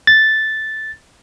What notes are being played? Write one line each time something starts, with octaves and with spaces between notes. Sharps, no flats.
A6